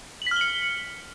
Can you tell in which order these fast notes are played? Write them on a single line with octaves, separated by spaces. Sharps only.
F#7 B6 F6 G7 C#7